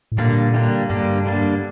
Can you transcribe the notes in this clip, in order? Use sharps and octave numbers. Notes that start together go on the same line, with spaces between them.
A2
A#2 D3 G3 A#3 D4
D3 G3 A#3 D4
G2 D3 G3 A#3 D4
D3 G3 A#3 D4